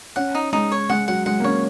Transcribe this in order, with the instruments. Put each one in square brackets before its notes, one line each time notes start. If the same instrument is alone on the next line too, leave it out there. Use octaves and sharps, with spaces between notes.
[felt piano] C#4 [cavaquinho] F#5
[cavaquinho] D#4
[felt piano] G#3 [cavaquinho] D#4
[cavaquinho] C#5
[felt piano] G#3 [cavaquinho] F#5
[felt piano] F#3 [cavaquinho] F#5
[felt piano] G#3 [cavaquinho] F#5
[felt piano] A#3
[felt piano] C#4 [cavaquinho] C#5